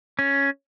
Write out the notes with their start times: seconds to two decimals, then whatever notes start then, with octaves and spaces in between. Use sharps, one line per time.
0.19 C#4